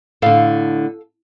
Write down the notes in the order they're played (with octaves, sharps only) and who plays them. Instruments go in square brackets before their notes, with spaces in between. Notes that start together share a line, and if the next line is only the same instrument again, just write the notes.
[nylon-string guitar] A2 D3 [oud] A4 F5